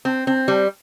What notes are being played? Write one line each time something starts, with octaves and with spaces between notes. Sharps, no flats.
C4
C4
G3